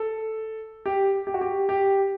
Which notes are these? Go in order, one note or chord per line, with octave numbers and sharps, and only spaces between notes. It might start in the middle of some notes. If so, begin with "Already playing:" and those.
Already playing: A4
G4
G4
F#4
G4
G4